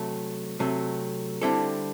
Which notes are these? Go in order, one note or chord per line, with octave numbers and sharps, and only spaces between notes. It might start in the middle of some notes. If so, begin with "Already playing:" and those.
Already playing: C3 F#3 A3
C3 F#3 A3
D3 G3 C4 E4 A4